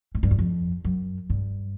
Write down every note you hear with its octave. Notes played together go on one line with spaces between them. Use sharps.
G#2
G2
F#2
F2
F#2
G2